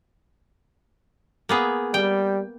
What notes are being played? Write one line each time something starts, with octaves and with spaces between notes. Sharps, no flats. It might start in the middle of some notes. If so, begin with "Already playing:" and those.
A#3 B3 G#4
G3 G5